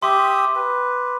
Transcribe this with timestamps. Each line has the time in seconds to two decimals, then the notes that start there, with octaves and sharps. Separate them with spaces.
0.03 G4 E5 C6 D6 D#6
0.56 B4